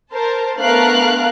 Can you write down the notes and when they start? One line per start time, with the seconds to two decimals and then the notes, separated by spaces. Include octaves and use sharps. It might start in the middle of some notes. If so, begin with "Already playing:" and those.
0.13 A#4 C5 A5
0.60 A3 B3 D4 A#4 F5 F#6